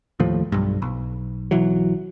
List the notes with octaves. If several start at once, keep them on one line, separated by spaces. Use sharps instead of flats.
D#2 A2 F3
B1 G2
B1
B1 E3 F#3